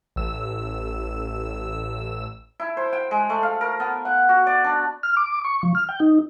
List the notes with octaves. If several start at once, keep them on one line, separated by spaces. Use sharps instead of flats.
A1 E6
E4
C5
G5
G#3
A3
F5
A#4
B3
F#5
F#4
D5
D4
F6
D6
C#6
F3
F6
G5
D#4